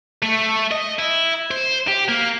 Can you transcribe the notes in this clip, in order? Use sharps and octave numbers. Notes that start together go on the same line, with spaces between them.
A3
D#5
E4
C5
G4
A#3